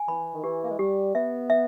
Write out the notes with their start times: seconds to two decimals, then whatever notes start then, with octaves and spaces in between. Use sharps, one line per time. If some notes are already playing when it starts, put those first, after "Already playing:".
Already playing: G#5
0.08 E3 B5
0.33 D#3
0.43 E3 G4
0.63 A#3
0.71 G#3
0.79 G3 G4
1.15 B3 E5
1.50 E5